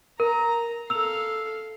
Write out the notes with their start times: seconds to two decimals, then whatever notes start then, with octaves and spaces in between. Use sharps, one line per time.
0.20 A#4 A#5
0.90 A4 F5 E6 F7